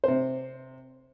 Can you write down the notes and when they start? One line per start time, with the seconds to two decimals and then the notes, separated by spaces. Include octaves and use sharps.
0.04 C3 C5